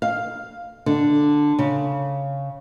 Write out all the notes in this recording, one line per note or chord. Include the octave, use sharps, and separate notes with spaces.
F5
D3
C#3